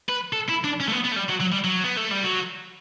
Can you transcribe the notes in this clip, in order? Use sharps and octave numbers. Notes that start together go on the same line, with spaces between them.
B4
A4
E4
D4
C#4
A3
B3
B3
A3
G3
F#3
F#3
G3
F#3
B3
A3
G3
F#3